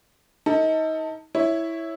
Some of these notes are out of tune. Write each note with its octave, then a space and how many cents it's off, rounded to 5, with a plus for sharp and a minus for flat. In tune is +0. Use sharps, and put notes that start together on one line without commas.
D#4 +30 A4 +25
E4 -5 C#5 +0